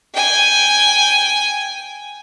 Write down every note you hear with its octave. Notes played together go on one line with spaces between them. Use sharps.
G5 G#5